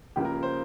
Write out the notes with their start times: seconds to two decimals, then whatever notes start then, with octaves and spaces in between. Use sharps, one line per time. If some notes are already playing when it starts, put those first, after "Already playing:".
0.16 C#2 C#3 F3 A#3 G4
0.25 A#4
0.43 C5